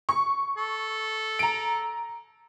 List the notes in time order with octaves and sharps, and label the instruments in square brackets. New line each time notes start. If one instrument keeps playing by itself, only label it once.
[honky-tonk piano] C#6
[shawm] A4
[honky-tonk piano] A#5 D7